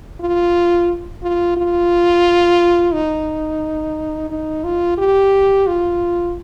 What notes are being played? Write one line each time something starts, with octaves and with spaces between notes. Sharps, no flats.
F4
F4
F4
D#4
D#4
F4
G4
F4